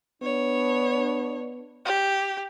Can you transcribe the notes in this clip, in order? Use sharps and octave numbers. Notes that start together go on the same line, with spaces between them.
B3 D4 C#5
G4